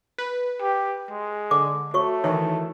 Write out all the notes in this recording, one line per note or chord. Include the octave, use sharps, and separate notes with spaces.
B4
G4
G#3
D3 D6
A3 F#4 C#5 C#6
D#3 E3 C#5